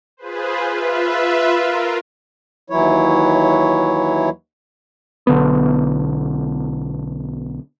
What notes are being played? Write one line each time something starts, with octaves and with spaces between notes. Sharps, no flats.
F4 G#4 B4 C5
F4 B4 E5
F4 A#4
D#2 E3 F#3 E4 C#5
B1 D3 B3